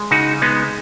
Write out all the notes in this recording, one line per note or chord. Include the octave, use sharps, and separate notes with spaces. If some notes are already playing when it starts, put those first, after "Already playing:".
Already playing: G#3
C#3 D#4 F#4
G#3 B3 D#4